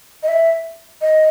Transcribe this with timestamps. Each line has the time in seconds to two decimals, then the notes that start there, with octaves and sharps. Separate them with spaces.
0.23 D#5
0.28 E5
1.01 D#5